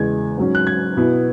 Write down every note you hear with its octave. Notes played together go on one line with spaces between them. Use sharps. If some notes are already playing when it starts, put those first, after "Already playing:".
Already playing: E2 C#3 G#3 G#6
G#2 F#3 C#4
F#6
G#6
B2 B3 E4